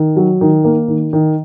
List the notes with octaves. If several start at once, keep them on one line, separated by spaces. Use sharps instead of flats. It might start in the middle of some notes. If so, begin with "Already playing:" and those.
Already playing: D#3
F#3
D#3
A#3
D#3
D#3